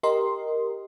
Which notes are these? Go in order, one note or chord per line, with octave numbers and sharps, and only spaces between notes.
G4 A#4 D#5 C6